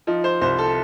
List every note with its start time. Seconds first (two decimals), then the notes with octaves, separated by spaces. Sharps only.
0.07 F3 D#4
0.24 C5
0.41 C2 C5
0.58 A4